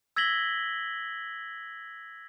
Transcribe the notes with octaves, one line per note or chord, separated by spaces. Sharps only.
E6 G#6 A#6 B6 F#7 G7